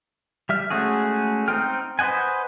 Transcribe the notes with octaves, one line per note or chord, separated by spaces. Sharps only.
G3 E5 F6
G#3 A3 C#4 F#4 G#4
C4 D#4 C5 G5 F6
B4 C5 D#5 F#5 G#5